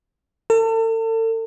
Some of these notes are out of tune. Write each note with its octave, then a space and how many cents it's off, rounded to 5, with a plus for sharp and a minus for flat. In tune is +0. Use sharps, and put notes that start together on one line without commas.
A4 +40